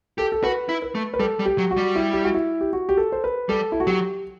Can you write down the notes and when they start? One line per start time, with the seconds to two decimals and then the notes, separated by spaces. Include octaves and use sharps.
0.18 G4 A4
0.32 A4
0.43 F#4 B4
0.69 E4
0.82 B4
0.95 A3
1.14 B4
1.19 G3 A4
1.39 G3
1.45 G4
1.58 F#3
1.71 F#4
1.77 G3
1.96 E4
2.13 G4
2.24 F#4
2.35 E4
2.61 G4
2.73 F#4
2.89 G4
2.97 A4
3.12 C5
3.24 B4
3.49 G3 A4
3.72 E4
3.80 F#4
3.87 F#3 G4